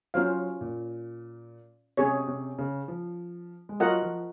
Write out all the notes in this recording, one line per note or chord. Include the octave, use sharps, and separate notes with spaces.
F#3 C#4 F4 C5 F5
A#2
C3 C#4 G#4 C#5
C3
C#3
F3
G#3
F#3 F4 A#4 D#5 F#5
F3